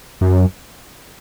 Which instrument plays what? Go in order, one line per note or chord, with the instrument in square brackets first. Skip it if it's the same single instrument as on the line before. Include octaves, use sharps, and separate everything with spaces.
[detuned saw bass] F#2